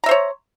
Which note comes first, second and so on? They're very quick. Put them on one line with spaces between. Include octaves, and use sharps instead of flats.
A#5 E5 C5 C#5